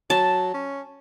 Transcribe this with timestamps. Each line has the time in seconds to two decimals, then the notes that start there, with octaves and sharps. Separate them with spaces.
0.10 F#3 A5
0.54 C#4